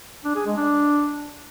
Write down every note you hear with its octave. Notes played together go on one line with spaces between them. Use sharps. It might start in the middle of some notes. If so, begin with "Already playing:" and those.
D4
G#4
G#3
D4